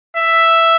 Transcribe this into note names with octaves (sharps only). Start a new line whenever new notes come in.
E5